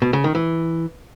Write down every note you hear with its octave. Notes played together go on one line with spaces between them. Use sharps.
B2
C#3
D#3
E3